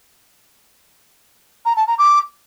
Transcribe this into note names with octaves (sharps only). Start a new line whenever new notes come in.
A#5
A5
A#5
D6